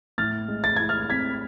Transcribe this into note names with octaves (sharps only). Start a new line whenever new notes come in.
A2 F6 A6
G#3
A6
E4 G#6
F6 A6
C4 G#6 B6